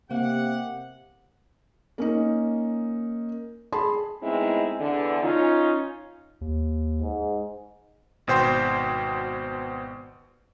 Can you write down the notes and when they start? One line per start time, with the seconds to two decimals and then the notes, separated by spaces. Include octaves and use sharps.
0.11 C3 A#3 G4 F#5
1.98 A#3 C#4 D#4
3.72 G#4 A5 B5 C6
4.23 A2 G#3 B3 C4 D#4 E4
4.80 E2 D3
5.22 C#4 D#4 F4
6.41 D#2
7.01 G#2
8.27 G#1 B2 C5 G5 C6